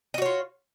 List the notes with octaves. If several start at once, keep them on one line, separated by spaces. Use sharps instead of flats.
F4 F#4 C#5 D#5